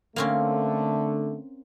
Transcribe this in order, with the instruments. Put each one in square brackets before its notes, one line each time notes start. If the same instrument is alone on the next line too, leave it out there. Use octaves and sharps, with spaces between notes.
[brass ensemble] D3 A3 [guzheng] A#3 C4 C#4